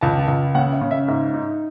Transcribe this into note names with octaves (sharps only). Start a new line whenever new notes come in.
C#2 A5
A5
C#2
C#3 F#5
E5
C#3
E5
G#2 E5
D#4